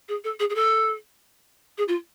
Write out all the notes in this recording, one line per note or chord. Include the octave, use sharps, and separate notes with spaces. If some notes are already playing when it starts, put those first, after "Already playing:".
G#4
A4
G#4
G#4
A4
G#4
F4